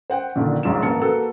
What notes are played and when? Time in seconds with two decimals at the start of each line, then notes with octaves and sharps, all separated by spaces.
0.10 C5 F#5 G5
0.36 A#1 A#2 D3 D#3
0.63 E1 A#1 G#2 F4 A#5 E7
0.83 A1 A#3 A5 C#7
1.02 A#3 F#4 A4 B4